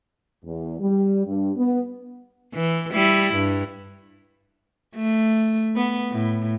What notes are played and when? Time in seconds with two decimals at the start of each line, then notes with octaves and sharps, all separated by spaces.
0.44 E2
0.79 G3
1.26 G2
1.55 B3
2.54 E3
2.93 G3 E4
3.34 G2
4.95 A3
5.76 B3
6.11 A2